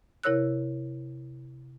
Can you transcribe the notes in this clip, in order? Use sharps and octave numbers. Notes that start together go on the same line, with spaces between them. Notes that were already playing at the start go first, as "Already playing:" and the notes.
C3 E4 A#4 C#5 E6 F#6